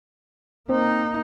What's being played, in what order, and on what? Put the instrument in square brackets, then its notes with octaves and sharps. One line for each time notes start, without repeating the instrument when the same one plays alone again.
[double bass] A#3 D#4 [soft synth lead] C4